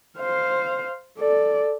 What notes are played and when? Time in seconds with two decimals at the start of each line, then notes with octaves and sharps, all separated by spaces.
0.19 C5 F5
1.19 A4 D5